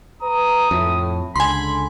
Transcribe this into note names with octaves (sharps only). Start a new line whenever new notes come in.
B4 A#5 D#6
F2 A2
C#2 D3 G#5 B5 C6